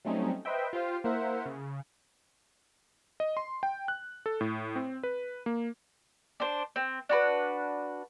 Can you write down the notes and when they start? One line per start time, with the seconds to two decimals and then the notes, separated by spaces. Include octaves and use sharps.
0.05 F#3 G3 A3 C4 C#4 D#4
0.45 B4 C5 D#5 E5 G5
0.73 F4 G4 C5 F5
1.04 A#3 E4 A#4 C5 E5 F#5
1.46 C#3
3.20 D#5
3.37 C6
3.63 G5
3.88 F#6
4.26 A4
4.41 A2
4.76 C4
5.03 B4
5.46 A#3
6.40 D4 C5
6.76 C4
7.09 D4 F#4 B4